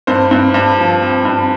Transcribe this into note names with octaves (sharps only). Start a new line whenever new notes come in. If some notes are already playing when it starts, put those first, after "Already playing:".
G2 C5
G2
G2
F3
C4
G2